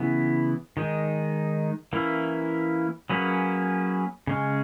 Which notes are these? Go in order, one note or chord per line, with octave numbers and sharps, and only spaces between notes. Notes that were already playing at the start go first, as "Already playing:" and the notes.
Already playing: C#3 E3 B3 E4
D#3 G#3 D#4
E3 A#3 C#4 E4
F#3 A#3 C#4 G#4 B4
C#3 G#3 C#4